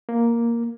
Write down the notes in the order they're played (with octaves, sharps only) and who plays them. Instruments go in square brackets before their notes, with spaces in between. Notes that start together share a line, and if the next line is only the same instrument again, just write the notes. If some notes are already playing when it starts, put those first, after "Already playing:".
[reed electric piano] A#3